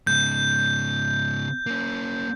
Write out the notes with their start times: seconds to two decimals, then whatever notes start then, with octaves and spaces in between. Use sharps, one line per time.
0.07 G#2 C#3 G6
1.66 A#3 C#4